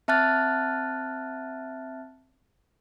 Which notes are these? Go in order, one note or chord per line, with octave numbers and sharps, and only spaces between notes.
C4 E5 A5 F6 F#6 A6